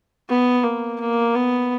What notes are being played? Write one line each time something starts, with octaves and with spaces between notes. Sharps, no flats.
B3
A#3
A#3
B3